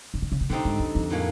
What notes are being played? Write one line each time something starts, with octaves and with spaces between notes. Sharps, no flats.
D#3
D3
C#3
C3
B2 D3 G3 C4 D#4
G#2
E2
F2
A2 F#3 A#3 C#4